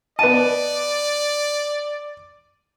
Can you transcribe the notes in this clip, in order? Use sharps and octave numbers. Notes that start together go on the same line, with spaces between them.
B3 D5 D#5 A5 D#7